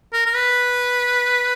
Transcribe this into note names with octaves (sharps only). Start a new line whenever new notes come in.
A#4
A#4
B4